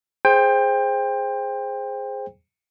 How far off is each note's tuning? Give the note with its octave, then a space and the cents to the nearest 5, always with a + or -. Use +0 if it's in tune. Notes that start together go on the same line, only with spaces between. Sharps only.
G#4 +0 C5 +5 G5 +25